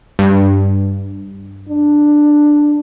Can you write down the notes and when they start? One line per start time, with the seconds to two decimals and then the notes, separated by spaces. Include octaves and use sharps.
0.19 G2
1.69 D4